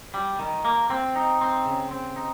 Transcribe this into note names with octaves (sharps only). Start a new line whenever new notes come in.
G3
D#3
A#3
C4
D#4
C4
C#3
C4
D#4